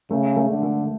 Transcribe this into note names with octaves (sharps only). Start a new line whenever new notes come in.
C#3 A3
A3
D3
A3